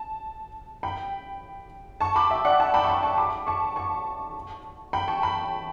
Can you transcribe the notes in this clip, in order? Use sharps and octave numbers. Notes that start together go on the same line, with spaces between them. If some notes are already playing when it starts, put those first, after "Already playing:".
Already playing: A5
G5 B5
A5 C#6
B5 D6
E5 G5
D5 F#5
F#5 A5
G5 B5
C#6
G5 B5
A5 C#6
B5 D6
A5 C#6
A5 C#6
G5 B5
A5 C#6
G5 B5